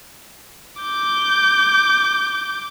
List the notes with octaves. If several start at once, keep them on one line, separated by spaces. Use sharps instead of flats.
D6 G6